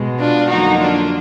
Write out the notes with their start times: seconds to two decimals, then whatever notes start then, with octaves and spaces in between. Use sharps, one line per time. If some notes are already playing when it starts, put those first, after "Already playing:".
Already playing: B2 G#3
0.19 D4 F4
0.48 F2 D3 F#3 A#3 D#4 F#4
0.79 D4 F4